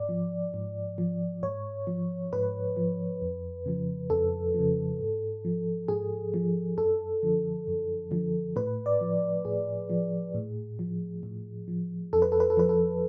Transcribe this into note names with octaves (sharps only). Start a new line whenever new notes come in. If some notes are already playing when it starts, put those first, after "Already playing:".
Already playing: G#2 D5
F3
G#2
F3
G#2 C#5
F3
G#2 B4
F3
F2
C#3 F3
F2 A4
C#3 F3
G#2
F3
G#2 G#4
F3
F#2 A4
D3 F3
F#2
D3 F3
A2 B4
D5
F3
A2 G#4
F3
A2
F3
A2
F3
F2 A4
B4
A4
B4
A4
F3 B4
A4